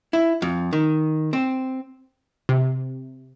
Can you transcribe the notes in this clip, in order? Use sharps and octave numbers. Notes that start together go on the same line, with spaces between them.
E4
F2
D#3
C4
C3